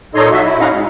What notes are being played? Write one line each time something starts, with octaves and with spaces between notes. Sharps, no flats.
A#2 D#4 A4 C#5 D#5 C6
F#3 F#4 E5
E4
C#4 D#4 D#5 F5 F#5 A#5
G#3